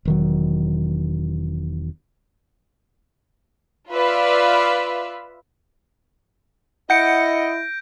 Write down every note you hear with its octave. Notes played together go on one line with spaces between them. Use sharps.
E1 D#3 F#3
F4 B4 D5 E5 F5
E4 D#5 F#5 G6 A#6 C#7 D7